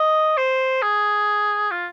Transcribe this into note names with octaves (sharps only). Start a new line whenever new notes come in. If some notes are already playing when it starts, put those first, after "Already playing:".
Already playing: D#5
C5
G#4
F4